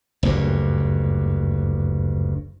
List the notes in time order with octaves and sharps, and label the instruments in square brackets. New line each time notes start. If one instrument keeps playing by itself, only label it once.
[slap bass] F#1 D2 G2